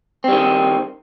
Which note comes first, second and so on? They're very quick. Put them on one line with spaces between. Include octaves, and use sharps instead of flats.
C4 G3 D#3